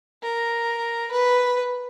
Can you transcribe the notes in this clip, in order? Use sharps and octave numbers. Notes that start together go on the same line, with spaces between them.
A#4
B4